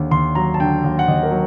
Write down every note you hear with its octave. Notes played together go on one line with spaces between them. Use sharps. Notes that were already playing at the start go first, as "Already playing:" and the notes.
Already playing: D#2 D3
D#2 C6
F#3 A#5
A5
D3 G5
D#2
F#5
D#2 D#5
A#4
F#3